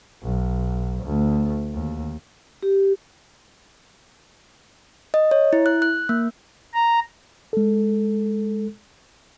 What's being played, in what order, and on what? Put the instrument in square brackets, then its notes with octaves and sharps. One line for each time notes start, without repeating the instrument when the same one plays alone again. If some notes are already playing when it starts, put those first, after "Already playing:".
[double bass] B1
D2
D#2
[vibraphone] G4
[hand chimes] D#5
C#5
E4
F#6
F#6
A#3
[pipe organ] A#5
[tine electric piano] G#3 A4